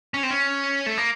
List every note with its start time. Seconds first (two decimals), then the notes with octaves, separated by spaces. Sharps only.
0.14 C#4
0.23 C4
0.31 C#4
0.86 A3
0.98 A#3